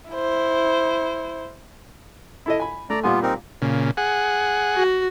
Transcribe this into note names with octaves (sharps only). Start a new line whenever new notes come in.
E4 C5
E4 A4 D#5
G#5 B5
A3 D5 A#5
A#2 G3 B3 F4 G#5
C4 D#4 A#4
A#2 C#3
G#4 F#5
F#4